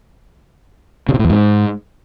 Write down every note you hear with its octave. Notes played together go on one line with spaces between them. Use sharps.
C#3
C3
A2
E2
G#2